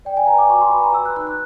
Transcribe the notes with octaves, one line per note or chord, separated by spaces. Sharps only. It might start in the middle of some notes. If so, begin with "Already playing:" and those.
D5 G5
G#5
B4 A#5
D6
F#4 C#6
C6
B4 B5
A#5
B4 E6
F#6
D#4 F#6
F#6